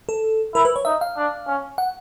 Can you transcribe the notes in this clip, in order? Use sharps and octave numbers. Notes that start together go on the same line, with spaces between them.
A4
E4 A#4
B4
C#5
D#4 E5
F5
D4
C#4
F#5